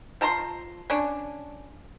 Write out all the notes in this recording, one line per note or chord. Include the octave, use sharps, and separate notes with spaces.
F3 A5 A#5 C6
C#4 D4